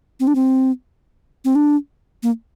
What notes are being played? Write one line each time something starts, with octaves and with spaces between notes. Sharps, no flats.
C4
D4
C4
C4
D4
A#3